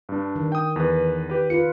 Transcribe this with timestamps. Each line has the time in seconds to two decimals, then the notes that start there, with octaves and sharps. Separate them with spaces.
0.09 G2 D4
0.36 D#3
0.52 G5 D#6
0.76 E2 B4
1.30 G4 B4
1.50 F4 B4 C#7